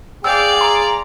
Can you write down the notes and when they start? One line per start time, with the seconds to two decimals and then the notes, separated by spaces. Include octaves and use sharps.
0.24 G#4 D5 F5 G5 E6
0.61 A#5 C6